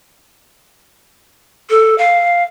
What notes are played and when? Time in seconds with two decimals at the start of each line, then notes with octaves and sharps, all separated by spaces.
1.70 A4
1.98 F5